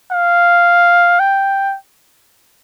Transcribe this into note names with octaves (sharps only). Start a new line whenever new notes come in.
F5
G5